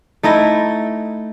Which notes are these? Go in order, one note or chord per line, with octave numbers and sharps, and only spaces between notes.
A3 D#4 E4 D#5